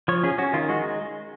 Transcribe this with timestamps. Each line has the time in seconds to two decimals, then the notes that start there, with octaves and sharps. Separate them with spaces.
0.08 F3 C#5
0.23 C#4 G#4
0.38 C#4 F#4
0.53 D#3 F4
0.69 G#3 F#4